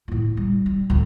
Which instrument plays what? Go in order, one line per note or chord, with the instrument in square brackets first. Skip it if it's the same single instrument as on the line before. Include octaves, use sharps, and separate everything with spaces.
[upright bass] A2 E4
G3
G3
D1 D2